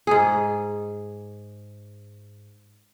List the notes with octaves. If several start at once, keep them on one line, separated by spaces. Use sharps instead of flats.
G#2 G#4